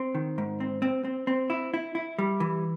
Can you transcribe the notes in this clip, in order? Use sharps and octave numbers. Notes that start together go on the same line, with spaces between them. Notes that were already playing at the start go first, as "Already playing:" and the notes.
Already playing: C4
D#3
G#2
C4
C4
C4
C4
E4
E4
E4
G3
E3